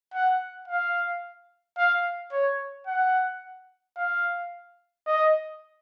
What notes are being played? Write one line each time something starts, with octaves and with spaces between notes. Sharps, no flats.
F#5
F5
F5
C#5
F#5
F5
D#5